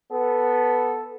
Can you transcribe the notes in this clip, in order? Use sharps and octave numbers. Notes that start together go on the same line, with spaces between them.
B3 A4